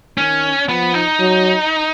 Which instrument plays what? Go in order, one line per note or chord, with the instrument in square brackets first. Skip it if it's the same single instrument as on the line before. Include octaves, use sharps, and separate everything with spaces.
[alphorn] D#3 [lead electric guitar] C#4
[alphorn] F3 [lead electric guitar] B3
[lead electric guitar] D#4
[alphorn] F#3